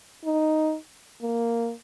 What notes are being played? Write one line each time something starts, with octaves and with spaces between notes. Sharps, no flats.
D#4
A#3